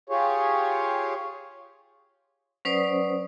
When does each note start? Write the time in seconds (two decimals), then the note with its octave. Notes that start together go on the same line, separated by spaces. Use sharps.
0.09 F4 G4 G#4 C#5
2.65 F#3 C#4 B4 C5 D5 D#6